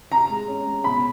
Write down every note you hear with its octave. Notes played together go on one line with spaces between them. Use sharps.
C3 A#5
G#3
C#4
G#3
B2 B5